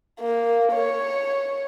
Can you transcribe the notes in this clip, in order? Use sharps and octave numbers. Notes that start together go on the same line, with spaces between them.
A#3
C#5